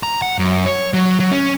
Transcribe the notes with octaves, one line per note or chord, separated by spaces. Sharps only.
A#5
F#5
F#2
C#5
F#3
F#3
C#4